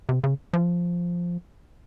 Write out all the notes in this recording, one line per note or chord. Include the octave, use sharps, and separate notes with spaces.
C3
C#3
F3